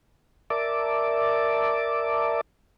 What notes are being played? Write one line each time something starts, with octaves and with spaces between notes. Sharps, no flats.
A#4 D5 E5 A5 D6